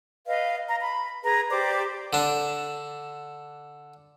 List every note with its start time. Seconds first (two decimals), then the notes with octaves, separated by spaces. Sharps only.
0.27 B4 D#5 F5
0.66 A#5
0.80 B5
1.23 G#4 B4 A#5
1.50 G4 C5 D5 D6
2.13 D3 D4